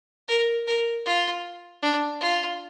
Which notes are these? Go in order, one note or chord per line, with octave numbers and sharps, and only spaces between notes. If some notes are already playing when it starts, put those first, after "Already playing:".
A#4
A#4
F4
D4
F4